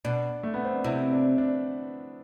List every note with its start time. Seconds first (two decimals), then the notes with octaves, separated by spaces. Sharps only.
0.05 B2 D4
0.43 A3
0.54 B3
0.65 C4
0.75 D4
0.84 C3 E4
1.12 D4
1.38 D4